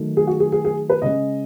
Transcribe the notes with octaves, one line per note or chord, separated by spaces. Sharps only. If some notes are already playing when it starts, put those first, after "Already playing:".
Already playing: D#3 F#3 A3
G#4
F#4
G#4
G#4
G#4
B4
C#3 G#3 D#5